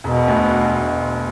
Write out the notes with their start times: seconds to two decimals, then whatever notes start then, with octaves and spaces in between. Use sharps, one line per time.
0.04 E1 B2
0.28 D2